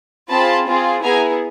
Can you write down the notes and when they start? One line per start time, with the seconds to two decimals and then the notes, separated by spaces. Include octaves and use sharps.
0.30 C4 F4 G#4 A5 B5
0.67 C4 F4 G#4
1.03 B3 E4 G#4 G#5 A#5